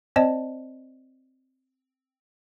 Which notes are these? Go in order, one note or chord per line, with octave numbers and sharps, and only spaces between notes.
C4 C5 D5 D#5 A5